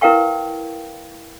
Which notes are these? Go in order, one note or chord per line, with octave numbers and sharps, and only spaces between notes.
E4 A#4 B4 F5 G5 C#6